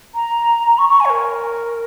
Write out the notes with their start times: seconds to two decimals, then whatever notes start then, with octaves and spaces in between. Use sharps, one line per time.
0.15 A#5
0.78 C#6
0.89 C#6
1.00 G#5
1.05 C#5
1.10 A#4